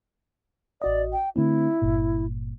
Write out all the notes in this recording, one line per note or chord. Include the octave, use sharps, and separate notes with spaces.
A1 F#4 D5 D#5
G5
D3 A3 C4 E4
G1 G2 A#2